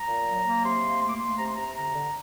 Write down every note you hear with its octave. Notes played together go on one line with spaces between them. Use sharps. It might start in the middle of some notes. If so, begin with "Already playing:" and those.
Already playing: A#5
A#2
F#3
A#3
C3 C6
A#3
A3 C6
D6
A3 C6
C3 A#5
C6
C3 A#5
D3 A#5
D3